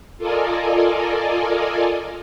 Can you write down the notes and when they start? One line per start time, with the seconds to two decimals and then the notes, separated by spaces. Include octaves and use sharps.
0.18 F4 A4 A#4 D5 D#5 G#5